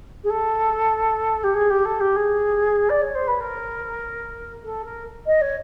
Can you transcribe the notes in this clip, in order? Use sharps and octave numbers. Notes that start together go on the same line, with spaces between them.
G#4
A4
G4
G#4
G4
A4
G4
G#4
D5
C#5
C5
B4
A#4
A4
A#4
D#5
C#5